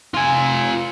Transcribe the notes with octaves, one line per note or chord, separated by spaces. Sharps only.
F4 G#5